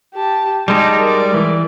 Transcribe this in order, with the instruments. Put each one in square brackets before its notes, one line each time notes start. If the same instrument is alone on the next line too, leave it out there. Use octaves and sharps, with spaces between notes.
[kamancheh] G4 A5
[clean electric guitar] G3 G#3 D#4 [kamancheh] A5 A#5
[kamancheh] A#4 D5
[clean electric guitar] E3